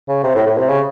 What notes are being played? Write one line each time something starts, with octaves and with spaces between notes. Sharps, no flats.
C#3
C3
A2
A2
C3
C#3